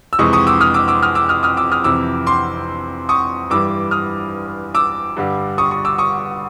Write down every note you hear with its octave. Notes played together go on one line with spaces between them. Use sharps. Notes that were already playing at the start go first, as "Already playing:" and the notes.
E6
F2 C3 E3 G#3 C#6 D#6
C#6 D#6
D6 E6
D#6 F6
D6 E6
D6 E6
D#6 F6
D6 E6
D#6 F6
D#6 F6
D6 E6
D#6 F6
F2 C3 E3 D6 E6
C6 D6
C#6 D#6
G2 E3 G3 D6 E6
D#6 F6
D6 E6
G2 D3 G3
C#6 D#6
C#6 D#6
D6 E6
C#6 D#6